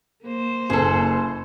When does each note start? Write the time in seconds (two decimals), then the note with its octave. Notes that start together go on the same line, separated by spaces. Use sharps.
0.22 A#3 C5
0.70 F#1 G#4 A4